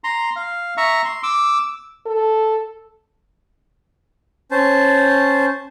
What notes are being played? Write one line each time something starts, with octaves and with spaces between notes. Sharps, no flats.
A#5 C6
F5
E5 A#5 C#6
C6
D6 E6
A4
C#4 C5 A5